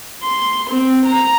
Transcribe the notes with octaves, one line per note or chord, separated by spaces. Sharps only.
C6
C4
A#5